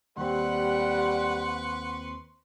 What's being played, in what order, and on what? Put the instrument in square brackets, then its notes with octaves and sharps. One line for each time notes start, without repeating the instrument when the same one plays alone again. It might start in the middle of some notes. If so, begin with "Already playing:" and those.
[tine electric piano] D#2 C4 [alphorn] G3 [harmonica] B4 C6 C#6 [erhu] F#5